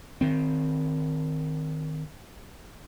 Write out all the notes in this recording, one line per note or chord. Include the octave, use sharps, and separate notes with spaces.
D#3 C4